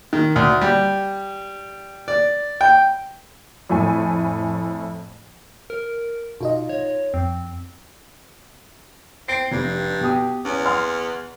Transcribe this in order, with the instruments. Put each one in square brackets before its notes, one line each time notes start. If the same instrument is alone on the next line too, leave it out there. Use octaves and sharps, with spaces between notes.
[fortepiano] D#3
D2
G3
D5
G5
[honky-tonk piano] F2 A2 A3 G#5
[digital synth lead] A#4
[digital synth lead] B2 [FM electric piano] D#4 F4 D#5
[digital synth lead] C#5
[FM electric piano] F2 [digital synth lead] C4
[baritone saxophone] C4 [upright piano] C7 D7
[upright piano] F1 [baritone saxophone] G2
[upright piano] B2 G4 D#6
[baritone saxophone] E2 [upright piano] C#4
[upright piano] F#5 C6 F6